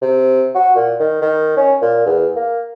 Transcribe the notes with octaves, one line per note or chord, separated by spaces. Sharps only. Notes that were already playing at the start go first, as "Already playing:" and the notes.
C3
F#4
A#2
D#3
D#3
C#4
A#2
E2
A#3